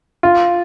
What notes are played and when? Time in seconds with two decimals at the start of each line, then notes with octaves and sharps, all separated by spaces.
0.23 F4